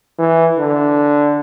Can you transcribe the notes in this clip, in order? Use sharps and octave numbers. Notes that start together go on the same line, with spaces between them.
E3
D3